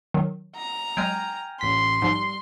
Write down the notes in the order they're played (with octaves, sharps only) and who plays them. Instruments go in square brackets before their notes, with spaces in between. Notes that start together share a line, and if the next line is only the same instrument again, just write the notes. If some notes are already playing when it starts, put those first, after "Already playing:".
[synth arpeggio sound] D#3 F#3
[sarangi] A#5
[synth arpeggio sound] F#3 G#3 [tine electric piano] G5 G#5 F6
[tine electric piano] A1 B6 [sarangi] C6
[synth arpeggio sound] G#2 F3 [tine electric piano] G3